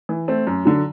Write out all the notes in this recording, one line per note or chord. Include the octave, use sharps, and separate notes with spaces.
E3
A3 C4
F#2
D3 F#3